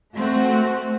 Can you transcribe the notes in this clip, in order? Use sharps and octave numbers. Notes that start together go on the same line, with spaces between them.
A3 C4 F#4